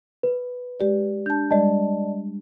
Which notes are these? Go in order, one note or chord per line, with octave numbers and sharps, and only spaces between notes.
B4
G#3 G4 D5
D4 A5 G6
G3 G#3 D5 D#5 A5